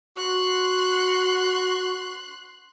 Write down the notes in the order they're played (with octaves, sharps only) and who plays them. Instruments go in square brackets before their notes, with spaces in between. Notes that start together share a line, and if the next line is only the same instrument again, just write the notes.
[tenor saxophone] F#4 [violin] C6 F#6